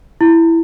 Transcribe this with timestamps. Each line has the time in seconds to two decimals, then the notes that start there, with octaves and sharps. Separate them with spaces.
0.21 E4